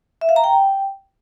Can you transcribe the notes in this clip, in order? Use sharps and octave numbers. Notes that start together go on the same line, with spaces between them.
E5
F5
A#5
G5